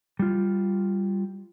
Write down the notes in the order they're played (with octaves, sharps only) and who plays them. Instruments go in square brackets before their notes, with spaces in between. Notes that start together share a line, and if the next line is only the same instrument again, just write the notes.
[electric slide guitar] G3 F4